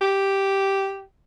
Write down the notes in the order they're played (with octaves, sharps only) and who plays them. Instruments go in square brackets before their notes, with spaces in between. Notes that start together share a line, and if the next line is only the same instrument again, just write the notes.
[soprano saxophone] G4